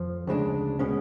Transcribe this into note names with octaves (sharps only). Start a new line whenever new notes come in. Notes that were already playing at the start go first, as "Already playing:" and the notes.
Already playing: F2 F3
D2 C#3 G#3 D4
B2 G#3 C#4